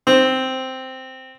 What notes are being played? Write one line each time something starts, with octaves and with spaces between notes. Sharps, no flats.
C4